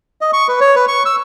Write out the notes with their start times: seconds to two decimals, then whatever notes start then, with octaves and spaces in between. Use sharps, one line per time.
0.21 D#5
0.33 C#6
0.48 B4
0.61 C#5
0.76 B4
0.88 C#6
1.06 E6